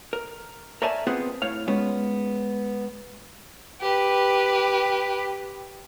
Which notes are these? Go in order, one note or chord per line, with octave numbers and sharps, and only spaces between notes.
A#4
A#4 C#5 D5 E5 G#5 A5
B3 C4 F4 G#4 B4 F#5
A2 C#5 F5
G#3 B3 C#4 F4
G4 B4